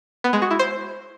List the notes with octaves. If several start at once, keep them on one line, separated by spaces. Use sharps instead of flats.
B3
G#3
F#4
E4
C5